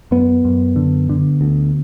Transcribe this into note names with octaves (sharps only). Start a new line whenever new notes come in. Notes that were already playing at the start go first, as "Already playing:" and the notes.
F#2 B3
F#2
D3
D3
D2